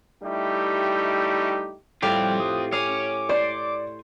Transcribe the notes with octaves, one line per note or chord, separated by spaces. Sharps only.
G3 A3 D#4 E4 G4
A2 G3 C4 F4 G4 F5
D#6
C#5 F5 G#5 D6
C5 D5